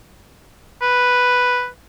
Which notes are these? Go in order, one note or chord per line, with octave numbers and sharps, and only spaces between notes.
B4